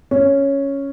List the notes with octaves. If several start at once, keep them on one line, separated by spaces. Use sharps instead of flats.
C#4